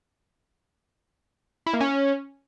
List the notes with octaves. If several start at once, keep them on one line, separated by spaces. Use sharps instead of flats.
E4
A#3
C#4